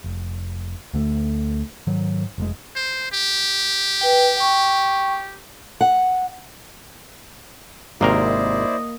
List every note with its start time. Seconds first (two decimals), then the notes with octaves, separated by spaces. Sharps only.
0.04 F1
0.93 D2 D3 A3
1.87 G#2 D#3 F#3
2.38 F1 A2 G#3
2.75 C5
3.12 G4
4.01 B4 G5
4.37 G5 C#6
5.81 F#5
8.01 G#1 C3 A#3 E4 A#4 C5 D5 D#5